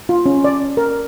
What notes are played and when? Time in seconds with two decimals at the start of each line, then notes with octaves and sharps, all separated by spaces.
0.09 F4
0.26 C#4
0.44 D5
0.77 A#4